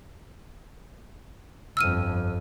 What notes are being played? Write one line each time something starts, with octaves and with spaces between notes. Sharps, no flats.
G1 F2 E6 F6 D#7